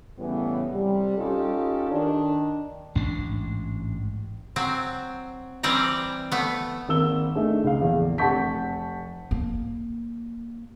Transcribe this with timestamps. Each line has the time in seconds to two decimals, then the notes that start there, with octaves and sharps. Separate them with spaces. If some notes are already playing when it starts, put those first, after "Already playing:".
0.18 A2 C#3 E3 G3 B3
0.74 C3 G3
1.16 C#4 D#4 F4 G4 A4
1.91 D#3 D4
2.95 A1 G#2 D4
4.56 F#3 C4
5.63 E3 G3 C4 D5 A#5
6.32 A3 B3
6.89 G#1 A#3 E6 G7
7.35 A3 D4 D#4 G#4
7.64 C#2 F5
7.81 A#1 E2
8.18 F1 F#5 A5 C#6 G6 B6
9.31 A#3